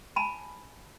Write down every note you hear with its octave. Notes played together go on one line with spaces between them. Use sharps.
G#5 A5 B5